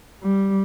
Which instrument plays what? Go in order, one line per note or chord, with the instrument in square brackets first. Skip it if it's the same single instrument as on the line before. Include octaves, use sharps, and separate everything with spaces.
[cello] G3